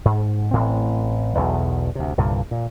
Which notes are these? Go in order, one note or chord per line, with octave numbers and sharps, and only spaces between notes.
G#2
A1 A2 C4
B1 E2 B2
D2 C3
C2 G2 A#2 D3
A#2